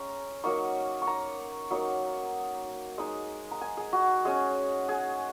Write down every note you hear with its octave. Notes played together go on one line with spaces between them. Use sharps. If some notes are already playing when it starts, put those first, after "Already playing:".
Already playing: G#3 C#4 A#5
F#3 A#3 D#4 C#6
C#6
A#5
F#3 A#3 D#4
G#3 D#4
A#5
G#5
G#4
F#4
G#3 C#4 G#4
G#4